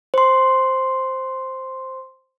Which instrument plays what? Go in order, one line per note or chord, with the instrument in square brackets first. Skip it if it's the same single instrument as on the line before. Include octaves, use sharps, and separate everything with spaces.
[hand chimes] C5 C6